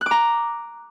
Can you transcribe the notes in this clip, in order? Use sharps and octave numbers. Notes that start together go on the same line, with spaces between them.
A#5 D6 F#6